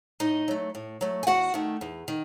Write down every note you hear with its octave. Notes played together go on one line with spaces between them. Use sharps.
A2 D#4 D#5
F#3 A3
A2
F#3 A3
G#5
E2 F#4 F#5
D#3 A3
E2
D#3